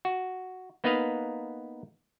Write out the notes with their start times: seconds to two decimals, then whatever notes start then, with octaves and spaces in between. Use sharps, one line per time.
0.05 F#4
0.84 A#3 B3 D#4 B4 D#5 F5